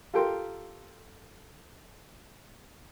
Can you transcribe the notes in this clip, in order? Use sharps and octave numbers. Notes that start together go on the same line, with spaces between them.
F4 G4 A4 A#4 G5 C6